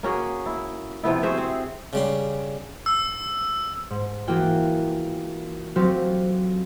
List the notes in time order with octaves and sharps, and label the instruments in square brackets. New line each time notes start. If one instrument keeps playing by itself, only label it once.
[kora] A#3 C#4 F#4 G#4
E4
C3 F3 B3 E4
F#4 G#4 C5 E5
C4
[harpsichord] C#3 G3 C6
[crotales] E6
[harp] G#2
E3 A#3 F4 F#4 G#4 G5
F#3 A3 C4 F4 G4